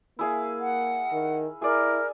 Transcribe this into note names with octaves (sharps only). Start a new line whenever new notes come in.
A#3 E4 G#4 F5
F#5
D#3
E4 G#4 A#4 D5